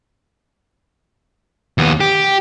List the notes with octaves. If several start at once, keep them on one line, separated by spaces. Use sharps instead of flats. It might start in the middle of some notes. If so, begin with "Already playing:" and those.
D#2 B3
G4